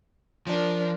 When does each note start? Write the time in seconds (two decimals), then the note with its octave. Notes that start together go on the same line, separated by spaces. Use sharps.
0.47 F3 D4 A#4